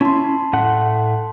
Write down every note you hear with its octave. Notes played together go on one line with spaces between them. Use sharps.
C#4 E4 A5 C6
A2 A3 F#5